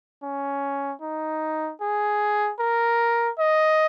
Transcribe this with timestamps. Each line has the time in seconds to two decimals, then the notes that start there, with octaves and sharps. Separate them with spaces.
0.23 C#4
1.02 D#4
1.81 G#4
2.60 A#4
3.39 D#5